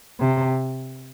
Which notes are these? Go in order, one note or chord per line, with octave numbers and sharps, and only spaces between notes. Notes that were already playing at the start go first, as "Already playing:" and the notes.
C3